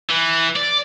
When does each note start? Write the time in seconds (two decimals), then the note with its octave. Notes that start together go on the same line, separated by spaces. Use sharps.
0.10 E3
0.56 D5